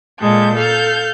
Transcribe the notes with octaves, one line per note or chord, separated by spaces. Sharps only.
A#2 G#3 A4 G6
A4 F5 G6